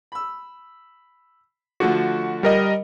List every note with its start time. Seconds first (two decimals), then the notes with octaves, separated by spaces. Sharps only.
0.12 B5 E6
1.80 D3 F3 A3 F#4
2.43 G3 A#4 D#5